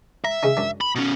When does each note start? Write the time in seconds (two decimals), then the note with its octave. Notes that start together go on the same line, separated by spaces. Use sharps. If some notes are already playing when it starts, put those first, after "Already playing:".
0.25 E5 A#5
0.43 C#3 C#4 D#4
0.57 F#2 D4
0.81 B5
0.95 B2 C#4